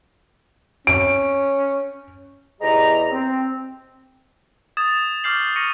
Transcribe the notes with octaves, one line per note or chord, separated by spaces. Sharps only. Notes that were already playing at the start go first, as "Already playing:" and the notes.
C#4 D7
E2 G#3 G4 D#5 A#5
C4
D#6 G#6 A6 E7
C#6 D6 F6 G6 C7 F#7
C#6 F6 A#6 C#7 D#7 F#7